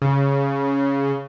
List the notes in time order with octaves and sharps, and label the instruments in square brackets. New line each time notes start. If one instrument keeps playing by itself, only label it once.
[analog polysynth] C#3